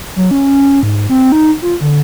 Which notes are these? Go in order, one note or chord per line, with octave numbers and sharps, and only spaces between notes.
F#3
C#4
G#2
C4
D#4
F4
D3